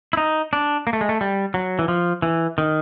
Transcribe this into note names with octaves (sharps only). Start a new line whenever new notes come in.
E4
D#4
D4
A#3
A3
G#3
A3
G3
F#3
E3
F3
E3
D#3